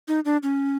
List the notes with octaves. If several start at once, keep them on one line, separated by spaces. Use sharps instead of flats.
D#4
D4
C#4